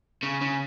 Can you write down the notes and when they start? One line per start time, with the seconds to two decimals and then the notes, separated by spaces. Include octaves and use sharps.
0.23 C#3
0.42 C#3